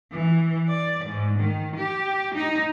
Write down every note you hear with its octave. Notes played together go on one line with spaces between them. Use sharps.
E3
D5
G#2
D#3
G4
D#4